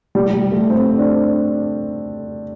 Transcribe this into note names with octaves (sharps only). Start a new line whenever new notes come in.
G3
G3
A3
C4
D4